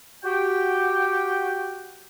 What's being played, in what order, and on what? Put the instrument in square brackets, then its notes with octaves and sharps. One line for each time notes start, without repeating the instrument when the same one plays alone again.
[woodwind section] F#4 G4 G5